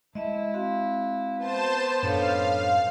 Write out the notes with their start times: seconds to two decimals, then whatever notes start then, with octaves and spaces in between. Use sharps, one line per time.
0.15 G#3 E4 D#5 E5 A5
0.54 C4 F#4 F5
1.39 B3 C5 A5 E7
2.03 F#2 A2 F#3 D4 A4 C#5 F5